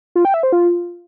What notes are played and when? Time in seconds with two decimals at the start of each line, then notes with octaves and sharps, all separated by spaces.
0.16 F4
0.25 G5
0.34 E5
0.43 C5
0.52 F4